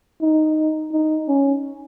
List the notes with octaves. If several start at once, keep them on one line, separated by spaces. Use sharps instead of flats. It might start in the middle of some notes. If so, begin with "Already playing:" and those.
D#4
D#4
C#4